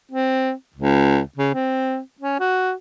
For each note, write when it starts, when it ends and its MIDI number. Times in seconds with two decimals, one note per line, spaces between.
0.11 0.52 60
0.76 1.20 37
1.37 1.51 49
1.54 1.99 60
2.20 2.39 61
2.40 2.72 66